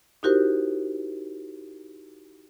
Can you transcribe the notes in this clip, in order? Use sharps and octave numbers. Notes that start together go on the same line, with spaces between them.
D#4 E4 F#4 G4 A#4 C5